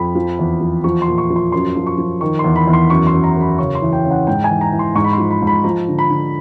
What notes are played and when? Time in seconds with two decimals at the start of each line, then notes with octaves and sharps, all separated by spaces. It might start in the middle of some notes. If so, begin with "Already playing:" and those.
Already playing: F2 B5
0.15 F3
0.39 E2
0.61 F3
0.84 F3 C#6
1.02 C6
1.08 A#2
1.18 C#6
1.30 F3
1.36 C6
1.52 F#2 C6
1.76 F3
1.87 C#6
1.98 F3
2.21 D#3 C#6
2.39 C6
2.44 E2
2.56 B5
2.67 E2
2.73 C6
2.90 F#2 C#6
3.07 C6
3.13 F#2
3.24 A#5
3.36 F#2
3.41 B5
3.58 C#3 C#6
3.75 C6
3.82 E3
3.93 G5
4.04 C#3
4.11 F#5
4.27 G#2 G5
4.44 G#5
4.50 E3
4.61 A#5
4.72 E3
4.79 C6
4.95 G#2 C#6
5.04 B5
5.13 F3 C6
5.31 B5
5.42 G#2
5.47 B5
5.64 F3 A#5
5.88 D3
5.99 B5
6.10 D3